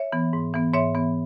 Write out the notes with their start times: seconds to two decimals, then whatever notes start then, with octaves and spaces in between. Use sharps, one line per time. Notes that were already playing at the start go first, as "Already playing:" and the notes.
Already playing: C#5 E5
0.12 E3 B3
0.33 G#2
0.54 E3 B3
0.74 G#2 C#5 E5
0.95 E3 B3